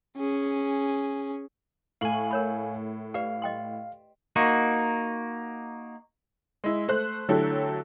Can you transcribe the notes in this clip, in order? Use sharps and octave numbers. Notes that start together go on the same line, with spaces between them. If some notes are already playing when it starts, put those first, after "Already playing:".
C#4 G#4
A2 F5 G#5 C#6 F#7
A#4 C#5 B5
G4 B4 D5 F5
D#5 G5 C6
A#3 D#4 F#4
G#3 E4
A3 C5 F#6
D3 F#3 A3 E4 G4 A4